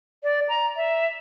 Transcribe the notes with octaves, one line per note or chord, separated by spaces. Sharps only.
D5
A#5
E5